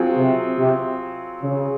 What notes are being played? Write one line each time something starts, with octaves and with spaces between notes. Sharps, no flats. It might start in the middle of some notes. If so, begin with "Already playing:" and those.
Already playing: F#3 C4 F4 G#4
C3
C3
C#3